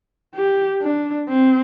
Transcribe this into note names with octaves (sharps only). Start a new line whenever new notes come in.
G4
D4
C4